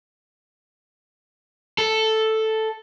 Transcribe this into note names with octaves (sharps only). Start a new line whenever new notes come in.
A4